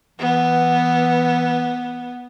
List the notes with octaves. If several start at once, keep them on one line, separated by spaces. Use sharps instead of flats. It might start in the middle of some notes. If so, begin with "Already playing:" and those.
E3 B3